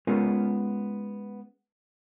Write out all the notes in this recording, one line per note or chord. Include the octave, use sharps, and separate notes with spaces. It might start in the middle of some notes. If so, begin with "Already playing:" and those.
G#3 B3 C#4 F4 A#4